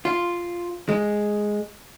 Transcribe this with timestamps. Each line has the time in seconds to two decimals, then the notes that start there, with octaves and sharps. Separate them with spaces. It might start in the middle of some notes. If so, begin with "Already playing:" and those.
0.05 F4
0.89 G#3